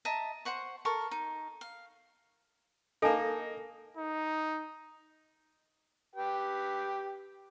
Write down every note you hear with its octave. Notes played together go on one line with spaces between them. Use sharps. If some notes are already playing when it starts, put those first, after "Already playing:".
D#5 E5 A5 A#5
C5 F#5 C#6
A4 A#4 C#6
D#4
F5
A#3 D#4 A4 G#5 A5
D#4
G4 B4 G5